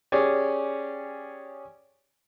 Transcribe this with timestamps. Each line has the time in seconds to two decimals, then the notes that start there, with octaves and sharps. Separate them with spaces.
0.12 C#4 G4 G#4 C#5 D5